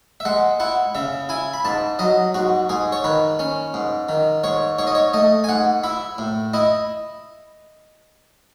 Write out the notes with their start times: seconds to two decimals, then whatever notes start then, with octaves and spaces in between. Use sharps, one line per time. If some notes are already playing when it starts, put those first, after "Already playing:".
0.20 E5
0.25 G#3 F#5
0.60 E4 F#5
0.95 C#3 E5
1.29 E4 G#5
1.54 B5
1.65 G#2 A5
1.99 F#3 D#5
2.34 G#2 F#4
2.69 G#2 G#4
2.92 C#5
3.04 D#3 B4
3.39 C#4
3.74 G#2
4.09 D#3
4.44 G#2 C#5
4.78 G#2 C#5
4.87 D#5
4.95 C#5
5.13 A3 D#5
5.44 G#5
5.49 G#2 F#5
5.84 E4 E5
6.18 A2
6.54 E4 D#5